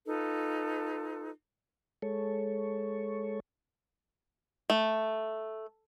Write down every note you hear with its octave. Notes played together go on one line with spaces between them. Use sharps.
D#4 F4 A4 B4
G#3 A4 C#5
A3